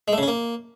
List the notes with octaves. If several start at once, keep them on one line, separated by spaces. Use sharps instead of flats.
G#3
A3
C#3
C#4
A#3